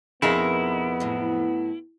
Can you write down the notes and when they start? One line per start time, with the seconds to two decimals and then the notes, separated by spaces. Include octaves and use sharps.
0.22 F2 B2 B3 D#4 E4 G#4 A#4
1.00 A2 F#3